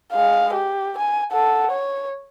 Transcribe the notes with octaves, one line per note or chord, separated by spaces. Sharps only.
G#3 F5
G4
G#5
A4 F#5
C#5